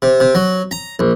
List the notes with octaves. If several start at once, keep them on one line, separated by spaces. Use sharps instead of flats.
C3
C3
F#3
A#5
A#1